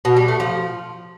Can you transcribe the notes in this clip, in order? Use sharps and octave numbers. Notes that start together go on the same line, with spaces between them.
B2
G3
A3
F3